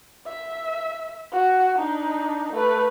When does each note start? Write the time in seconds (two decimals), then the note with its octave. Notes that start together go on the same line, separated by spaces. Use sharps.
0.26 E5
1.32 F#4
1.78 D4 D#4
2.53 A3 B4